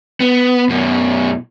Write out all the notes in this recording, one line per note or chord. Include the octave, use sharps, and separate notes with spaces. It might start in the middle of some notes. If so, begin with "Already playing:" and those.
B3
F#2 B2